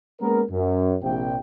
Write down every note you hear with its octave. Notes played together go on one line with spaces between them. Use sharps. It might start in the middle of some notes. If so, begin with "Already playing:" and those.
G#3 A#3 B3 C#4 A#4
F#2
A#1 C3 G5